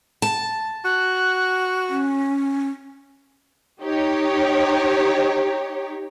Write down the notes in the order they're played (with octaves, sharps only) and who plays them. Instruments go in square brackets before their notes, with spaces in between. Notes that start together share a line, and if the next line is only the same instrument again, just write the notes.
[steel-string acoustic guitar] A5
[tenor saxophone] F#4 [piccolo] F#6
[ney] C#4
[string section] D#4 G4 C#5